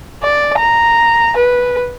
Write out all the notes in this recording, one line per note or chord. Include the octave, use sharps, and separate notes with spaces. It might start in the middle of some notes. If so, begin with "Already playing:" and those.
D5
A#5
B4